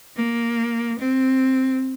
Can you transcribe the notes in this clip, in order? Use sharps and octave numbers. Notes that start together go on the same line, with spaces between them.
A#3
C4